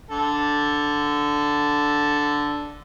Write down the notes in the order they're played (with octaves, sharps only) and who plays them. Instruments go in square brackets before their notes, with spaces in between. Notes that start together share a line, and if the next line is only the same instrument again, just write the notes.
[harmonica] D3 A4